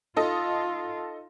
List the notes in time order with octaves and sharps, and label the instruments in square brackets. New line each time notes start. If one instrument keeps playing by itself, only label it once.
[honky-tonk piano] D#4 A4 D#5 [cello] F4